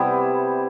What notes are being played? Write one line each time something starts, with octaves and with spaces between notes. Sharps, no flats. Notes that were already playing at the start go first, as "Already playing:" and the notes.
Already playing: C3 G3 B3 E4